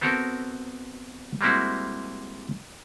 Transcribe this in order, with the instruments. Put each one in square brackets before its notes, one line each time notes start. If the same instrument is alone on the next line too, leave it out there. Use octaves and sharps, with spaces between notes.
[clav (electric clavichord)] B3 C4 F#4 A4 A#4
G3 G#3 A#3 C4 E4 F#4